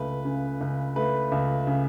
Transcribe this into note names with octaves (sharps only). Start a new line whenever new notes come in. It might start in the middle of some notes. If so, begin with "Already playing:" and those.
Already playing: C#2 A3 B4
C#3
C#2
A3 B4
C#2
C#3